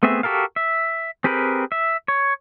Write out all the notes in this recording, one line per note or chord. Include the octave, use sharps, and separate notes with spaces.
A3 B3 C4 G#4 E5
F#4 G4 A4 A#4 F5
E5
C4 G4 G#4 A#4 B4
E5
C#5